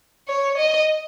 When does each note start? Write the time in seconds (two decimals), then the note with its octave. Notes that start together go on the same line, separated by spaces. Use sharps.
0.28 C#5
0.58 D#5